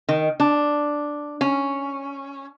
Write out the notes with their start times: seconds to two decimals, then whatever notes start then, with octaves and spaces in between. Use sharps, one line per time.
0.09 D#3
0.40 D4
1.41 C#4